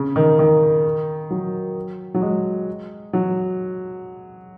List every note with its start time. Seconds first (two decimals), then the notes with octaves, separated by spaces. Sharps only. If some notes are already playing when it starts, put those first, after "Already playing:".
Already playing: C#3
0.16 D#3
0.39 D#3
1.31 F#3
2.14 F#3
2.22 G#3
3.13 F#3